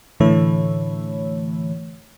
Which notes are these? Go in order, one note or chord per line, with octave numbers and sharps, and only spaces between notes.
A2 D3 E3 A3 C#5